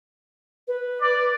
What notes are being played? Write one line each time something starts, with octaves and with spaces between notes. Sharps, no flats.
B4
D5